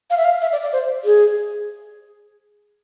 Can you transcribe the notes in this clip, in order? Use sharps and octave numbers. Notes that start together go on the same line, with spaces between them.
F5
E5
F5
E5
D5
D5
C5
G#4